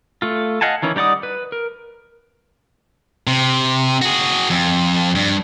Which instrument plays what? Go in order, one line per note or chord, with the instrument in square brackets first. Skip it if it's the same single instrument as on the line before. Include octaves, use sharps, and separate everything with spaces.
[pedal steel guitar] A3 F4
D#5 F5 F#5 G#5 A5
D#3 E3 C#4
G3 D#4 D5 F#5 D#6
B4
A#4
[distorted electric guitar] C3
F#4 G#4
F2
G2